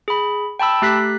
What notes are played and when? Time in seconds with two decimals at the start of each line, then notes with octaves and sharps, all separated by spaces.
0.08 G#4 B5
0.59 G5 A5 B5 E6
0.82 A3 G4 F#6 B6